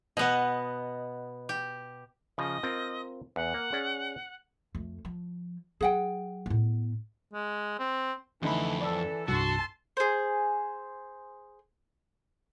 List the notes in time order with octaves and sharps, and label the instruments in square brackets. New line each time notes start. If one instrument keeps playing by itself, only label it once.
[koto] B2 B3 [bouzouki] D#5 F#5
[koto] G4
[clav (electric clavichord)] C#3 F3 [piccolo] D#5
[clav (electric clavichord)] C4 F4 A#4
[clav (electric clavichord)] E2 [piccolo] F#5
[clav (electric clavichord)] A#3
C#4 G#4 D5
[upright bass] F2 A3
F3
[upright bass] F#3 [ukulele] G#4 F#5 G5
[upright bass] A2 B3
[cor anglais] G#3
C4
[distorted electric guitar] F2 B5 [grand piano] D3 A3 D#4 [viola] E3
[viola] E3 A4 [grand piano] D5 A5 E6
[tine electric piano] C2 G2 [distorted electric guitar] F#4 [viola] A5 C6 [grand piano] E6
[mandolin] G#4 C5